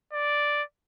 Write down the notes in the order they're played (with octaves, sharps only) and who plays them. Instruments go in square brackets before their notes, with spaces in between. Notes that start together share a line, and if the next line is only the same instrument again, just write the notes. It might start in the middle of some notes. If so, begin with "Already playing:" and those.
[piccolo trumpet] D5